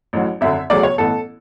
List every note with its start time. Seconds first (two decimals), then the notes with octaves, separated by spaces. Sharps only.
0.13 A1 A2 F#3
0.41 G#1 F#2 D3 E5
0.70 E1 D2 C#3 F#3 D5
0.83 C#5
0.98 A1 A2 E3 B3 A4